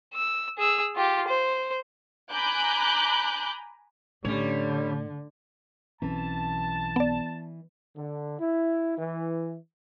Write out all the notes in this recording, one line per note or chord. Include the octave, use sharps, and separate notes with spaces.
E6
G#4 E6
F4 G4
C5
G#5 A#5 B5 D6 F#6 G6
A2 D3 G3 C#4 C#5
B1 E3 C4 C#4 A5
B3 D5
D3
E4
E3